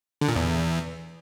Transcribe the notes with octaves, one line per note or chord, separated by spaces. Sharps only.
D3
A#2
E2